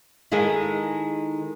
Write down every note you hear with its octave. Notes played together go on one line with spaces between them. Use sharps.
D#3 G#3 E4 G#4 A4